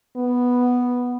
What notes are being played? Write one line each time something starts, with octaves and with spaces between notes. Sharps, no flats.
B3